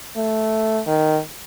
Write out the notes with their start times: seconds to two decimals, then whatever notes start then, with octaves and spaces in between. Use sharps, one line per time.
0.17 A3
0.87 D#3